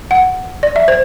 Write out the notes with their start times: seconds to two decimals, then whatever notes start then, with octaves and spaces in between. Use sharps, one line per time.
0.11 F#5
0.63 D5
0.76 E5
0.88 C5